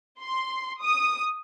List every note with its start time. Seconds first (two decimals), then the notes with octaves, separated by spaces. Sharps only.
0.21 C6
0.82 D#6